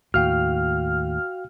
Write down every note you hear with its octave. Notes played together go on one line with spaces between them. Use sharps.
D#2 A2 F#4 F5 G5 F6